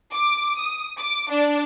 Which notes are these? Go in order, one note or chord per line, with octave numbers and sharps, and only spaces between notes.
D6
D#6
D6
D4